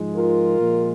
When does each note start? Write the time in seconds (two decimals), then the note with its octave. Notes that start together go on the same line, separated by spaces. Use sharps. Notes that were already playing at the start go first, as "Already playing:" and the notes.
Already playing: G#2 F3 G#3
0.14 F4 A#4
0.59 A#2 F3 G#3